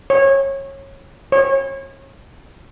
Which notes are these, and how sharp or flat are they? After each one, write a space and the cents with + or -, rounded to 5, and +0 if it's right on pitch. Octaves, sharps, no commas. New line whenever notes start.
C#5 -20
C#5 -30